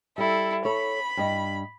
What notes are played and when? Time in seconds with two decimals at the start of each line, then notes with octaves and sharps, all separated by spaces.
0.18 G3 E4 A4
0.65 A4 C#5 B5
1.17 G2 D#5